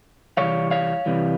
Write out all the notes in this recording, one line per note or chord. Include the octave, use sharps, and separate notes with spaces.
C2 C3 E3 G3 C#5 F5
C#5 F5
C2 C3 E3 G3